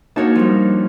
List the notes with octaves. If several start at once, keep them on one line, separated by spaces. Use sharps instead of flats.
A#3 D4 D#4 F#4 C#5 A5
F3 G3